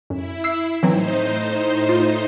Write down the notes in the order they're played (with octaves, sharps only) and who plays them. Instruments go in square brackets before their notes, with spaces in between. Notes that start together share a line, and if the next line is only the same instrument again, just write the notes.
[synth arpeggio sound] F#2 [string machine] E4
[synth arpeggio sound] E6 C7
[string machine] A2 D#4 C5 [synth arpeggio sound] E3 F#3 C4
[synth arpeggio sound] F4